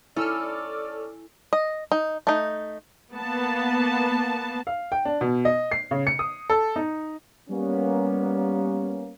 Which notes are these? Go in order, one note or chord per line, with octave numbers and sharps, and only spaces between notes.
C#4 E4 A4 D5 E6 F6
D#5
D#4
A3 D#4
A#3 B3 A5
F5
G5
D4
B2
D#5
C7
C#3
C#7
D#6
A4
D#4
G3 A#3 B3 C#4